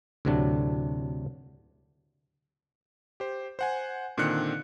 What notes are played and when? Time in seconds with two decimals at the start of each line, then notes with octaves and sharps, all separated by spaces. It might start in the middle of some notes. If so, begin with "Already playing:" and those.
0.25 D2 A2 C3 F#3 D4
3.20 G4 C5
3.59 C5 F#5 G#5
4.18 A#2 D3 D#3 C4 F#6 C#7